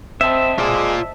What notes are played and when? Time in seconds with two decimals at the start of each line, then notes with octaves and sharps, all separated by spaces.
0.21 C4 C5 D#5 E5 A5
0.59 G#3 F4 D5